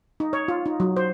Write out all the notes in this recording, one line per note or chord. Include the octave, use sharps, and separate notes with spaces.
D#4
C#5
F4
D#4
F#3
C5